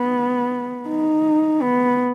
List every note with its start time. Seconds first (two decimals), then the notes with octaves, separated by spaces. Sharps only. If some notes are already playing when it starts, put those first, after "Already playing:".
Already playing: B3
0.89 D#4
1.62 B3